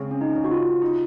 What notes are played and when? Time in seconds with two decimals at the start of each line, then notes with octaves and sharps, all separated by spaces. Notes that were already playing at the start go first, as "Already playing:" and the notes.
Already playing: C#3 G#3 C4
0.11 C#4
0.21 D#4
0.35 C#3
0.44 F#4
0.51 F4
0.82 D#4